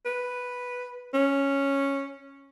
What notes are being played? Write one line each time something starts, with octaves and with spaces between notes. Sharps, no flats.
B4
C#4